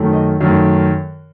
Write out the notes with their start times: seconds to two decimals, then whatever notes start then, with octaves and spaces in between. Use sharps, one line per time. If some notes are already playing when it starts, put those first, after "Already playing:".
Already playing: F#2 D#3 A3
0.13 D#5
0.40 F#2 D#3 A3